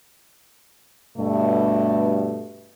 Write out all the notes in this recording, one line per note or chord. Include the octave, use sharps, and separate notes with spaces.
G2 B2 A3